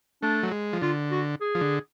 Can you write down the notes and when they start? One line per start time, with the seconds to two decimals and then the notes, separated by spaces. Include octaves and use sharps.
0.23 A3 D4
0.43 F#3
0.51 G#3
0.73 F3
0.82 D3 F4
1.11 F#4
1.41 G#4
1.55 F3
1.61 D3